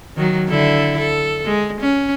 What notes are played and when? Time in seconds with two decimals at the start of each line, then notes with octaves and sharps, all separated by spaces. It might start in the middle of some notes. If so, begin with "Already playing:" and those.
0.16 D#3 F#3
0.48 D3 E4 A4
0.98 A4
1.45 G#3
1.81 C#4